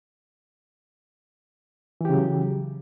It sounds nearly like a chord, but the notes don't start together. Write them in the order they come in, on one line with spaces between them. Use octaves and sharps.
E3 G4 C#3 F#3